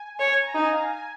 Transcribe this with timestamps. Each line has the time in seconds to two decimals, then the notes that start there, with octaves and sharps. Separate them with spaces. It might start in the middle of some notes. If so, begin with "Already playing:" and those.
Already playing: G#5
0.19 C#5
0.43 A#5
0.54 D#4 G#5
0.72 F5
0.90 G#5